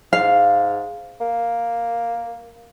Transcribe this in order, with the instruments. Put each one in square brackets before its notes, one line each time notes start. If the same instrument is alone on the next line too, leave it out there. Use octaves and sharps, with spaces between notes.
[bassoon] G#2 [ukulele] F5
[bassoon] A#3